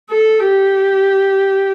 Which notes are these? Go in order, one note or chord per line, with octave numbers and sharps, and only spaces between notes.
A4
G4